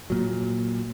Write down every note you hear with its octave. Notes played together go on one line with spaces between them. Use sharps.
A#2 F#3